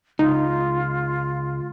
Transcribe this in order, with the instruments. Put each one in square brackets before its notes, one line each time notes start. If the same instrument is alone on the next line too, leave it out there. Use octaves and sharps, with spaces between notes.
[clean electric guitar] C#2 [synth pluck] D#4 [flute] F4